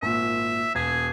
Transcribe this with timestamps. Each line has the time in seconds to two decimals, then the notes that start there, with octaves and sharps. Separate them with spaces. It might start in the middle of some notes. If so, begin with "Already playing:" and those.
0.02 G#1 A#2 E5
0.75 E1 G#4 G#6